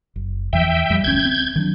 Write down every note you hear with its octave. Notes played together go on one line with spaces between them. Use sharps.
F#1
E2 E3 F3 E5 G5
F2 F3 G3
D1 D2 C#4 G6 G#6
C4
D#3 F#3 D4